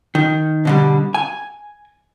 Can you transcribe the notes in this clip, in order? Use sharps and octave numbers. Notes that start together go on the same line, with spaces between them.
D#3
B2 D3 G3
G#5